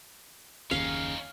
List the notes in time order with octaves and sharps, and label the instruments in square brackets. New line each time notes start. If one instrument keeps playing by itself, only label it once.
[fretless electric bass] F#1 D#2 C#3 [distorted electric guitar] C#4 D#4 [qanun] F5